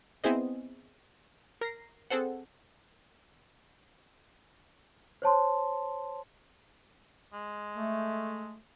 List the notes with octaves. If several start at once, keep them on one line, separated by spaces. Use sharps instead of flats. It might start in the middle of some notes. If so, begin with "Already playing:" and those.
B3 C4 E4 G#4 C5 D#5
A#4 A#6 C7
C4 G#4 A4 C5 F#5
C5 C#5 A5 C6
G#3
A3